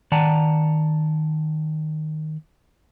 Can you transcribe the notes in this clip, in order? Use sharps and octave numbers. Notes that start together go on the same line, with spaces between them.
D#3 D5 F#5 A5 A#5